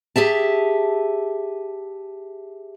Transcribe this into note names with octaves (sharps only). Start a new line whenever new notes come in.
G4 G#4 E5 A5